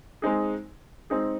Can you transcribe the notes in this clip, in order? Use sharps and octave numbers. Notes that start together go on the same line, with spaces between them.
G#3 C4 D#4 G#4
G#3 C4 D#4 G#4